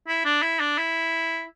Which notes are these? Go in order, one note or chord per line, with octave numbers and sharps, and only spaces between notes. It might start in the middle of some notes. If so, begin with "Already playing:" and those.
E4
D4
E4
D4
E4